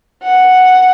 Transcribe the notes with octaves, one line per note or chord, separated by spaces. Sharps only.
F#5